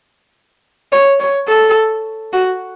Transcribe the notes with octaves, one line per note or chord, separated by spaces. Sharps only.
C#5
C#5
A4
F#4